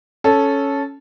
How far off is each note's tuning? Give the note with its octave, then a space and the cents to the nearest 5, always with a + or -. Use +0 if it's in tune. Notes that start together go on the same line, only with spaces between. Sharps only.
C#4 +0 A4 -10